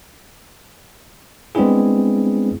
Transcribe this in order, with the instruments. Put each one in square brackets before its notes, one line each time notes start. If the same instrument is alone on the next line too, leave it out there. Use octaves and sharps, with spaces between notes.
[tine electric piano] G#3 B3 C4 D4 E4 G#4